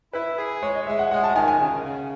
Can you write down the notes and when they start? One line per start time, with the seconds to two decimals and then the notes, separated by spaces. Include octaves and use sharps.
0.13 E4 B4
0.38 G#4
0.62 G#3 C#5
0.75 D#5
0.87 G#3 E5
0.99 F#5
1.11 G#3 F#5
1.24 A5
1.35 D#3 G#5
1.48 G#5
1.60 C#3
1.84 C#3